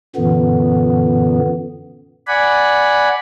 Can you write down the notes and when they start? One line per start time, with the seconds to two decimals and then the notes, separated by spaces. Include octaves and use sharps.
0.16 F#2 A#2 D3 E3 B3
2.27 D5 F#5 G#5 B5